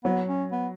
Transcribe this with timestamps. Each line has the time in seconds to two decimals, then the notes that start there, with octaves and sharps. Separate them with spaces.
0.04 F#3 B3
0.28 C#4
0.52 B3